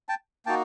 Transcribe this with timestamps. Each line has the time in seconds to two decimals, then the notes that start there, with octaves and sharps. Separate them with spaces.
0.09 G5 A5
0.46 A#3 D#4 F#4 G5 A5